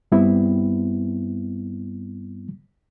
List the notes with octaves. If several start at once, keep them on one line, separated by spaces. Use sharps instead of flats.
G2 G3 B3 C4 E4